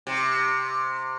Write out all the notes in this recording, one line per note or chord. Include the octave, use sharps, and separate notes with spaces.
C3